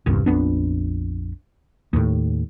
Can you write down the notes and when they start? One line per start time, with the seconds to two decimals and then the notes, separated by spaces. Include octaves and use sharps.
0.06 D#1 C2 G2
0.26 A#1 F2 B3 D4
1.93 D#2 A2